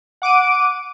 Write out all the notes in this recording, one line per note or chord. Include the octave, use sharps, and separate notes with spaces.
F#5 D6 D7 D#7